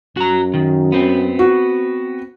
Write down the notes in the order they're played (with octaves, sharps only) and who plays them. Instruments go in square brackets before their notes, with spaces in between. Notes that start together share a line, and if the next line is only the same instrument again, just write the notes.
[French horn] F#2 [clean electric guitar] F#4 A#5
[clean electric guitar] D#3
B3 C4
[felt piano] F#4